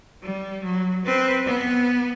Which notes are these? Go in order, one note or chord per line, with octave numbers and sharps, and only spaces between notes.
G3
F#3
C4 B4
B3